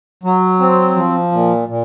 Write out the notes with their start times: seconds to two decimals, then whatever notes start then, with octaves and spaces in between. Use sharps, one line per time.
0.23 F#3
0.60 C4
0.96 F3
1.32 A#2
1.68 A#2